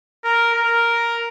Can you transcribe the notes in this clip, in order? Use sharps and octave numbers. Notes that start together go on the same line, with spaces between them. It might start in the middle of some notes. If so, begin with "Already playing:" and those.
A#4
A#4